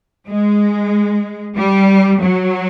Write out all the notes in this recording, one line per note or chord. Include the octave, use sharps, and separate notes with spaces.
G#3
G3
F#3